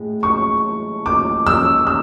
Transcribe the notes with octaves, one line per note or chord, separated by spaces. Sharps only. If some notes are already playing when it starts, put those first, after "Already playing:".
Already playing: A2 G#3
C#6
D6
E6
E6